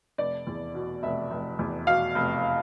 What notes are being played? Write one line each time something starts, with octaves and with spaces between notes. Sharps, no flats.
F1 D5
E2
B2
F1 E5
F1
E2
B2 F5
F1